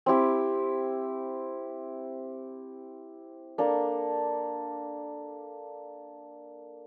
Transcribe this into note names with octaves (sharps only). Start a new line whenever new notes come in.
C4 E4 G4
A#3 D4 A4